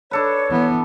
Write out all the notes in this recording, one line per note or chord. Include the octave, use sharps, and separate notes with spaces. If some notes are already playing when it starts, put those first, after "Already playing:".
D4 A4 B4 C#5
E3 B3